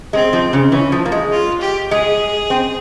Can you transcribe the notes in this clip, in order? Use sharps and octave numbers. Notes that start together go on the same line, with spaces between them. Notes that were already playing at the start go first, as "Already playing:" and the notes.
G#3 C4
F3
C#3
E3 C#4
F3
A#3
G#3
F4
G4
G#3 G#4
C4